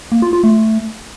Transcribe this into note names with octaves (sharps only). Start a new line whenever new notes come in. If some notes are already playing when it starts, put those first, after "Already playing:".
A#3
F4
F4
A3